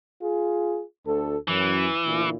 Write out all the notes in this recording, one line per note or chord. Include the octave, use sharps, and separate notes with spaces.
F4 G#4
D2 A4
F#2 E3
D2 A#2 E4